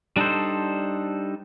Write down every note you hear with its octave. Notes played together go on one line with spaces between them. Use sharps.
G3 D4 D#4 A4 C5